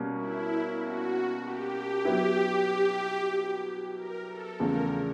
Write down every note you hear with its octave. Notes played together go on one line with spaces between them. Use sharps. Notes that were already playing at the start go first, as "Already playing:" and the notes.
Already playing: B2 G3 A#3 C#4
E4
F#4
G4
F#3 B3 E4
A#4
A4
E2 C#3 F3 A3 A#4